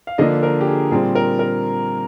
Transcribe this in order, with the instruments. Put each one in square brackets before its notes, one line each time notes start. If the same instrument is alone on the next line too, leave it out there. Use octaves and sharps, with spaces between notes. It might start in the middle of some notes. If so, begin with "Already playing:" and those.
[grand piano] F5
D3 F3 A#3 D4 D#5
A#4
G4
G#4
A#2 G3 C4 G#4
A#4
A#4